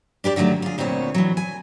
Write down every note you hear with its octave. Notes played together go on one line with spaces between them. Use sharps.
D4 G4 A#4 D5
D3 D#3 F#3 G#3 A3
F4 G#4
D2 A#2 B3 C4 C#5
E3 F#3
G#5